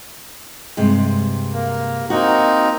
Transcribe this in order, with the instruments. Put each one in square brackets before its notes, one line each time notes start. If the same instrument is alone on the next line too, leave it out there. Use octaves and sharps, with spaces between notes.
[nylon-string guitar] G2 C3 G#3
[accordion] A#3
[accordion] A#3 C4 D#4 [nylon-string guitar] F#4